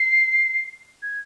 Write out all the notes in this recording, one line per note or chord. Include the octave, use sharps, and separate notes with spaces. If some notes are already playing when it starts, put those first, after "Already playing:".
Already playing: C7
G#6